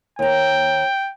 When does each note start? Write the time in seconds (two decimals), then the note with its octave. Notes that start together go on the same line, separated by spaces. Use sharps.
0.19 D#2 G5 A#5